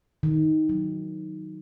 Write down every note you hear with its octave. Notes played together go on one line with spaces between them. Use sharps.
D#3
F#3